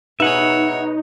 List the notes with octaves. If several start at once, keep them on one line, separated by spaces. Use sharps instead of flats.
B2 D#4 G#4 B4 C#5 E5 F#5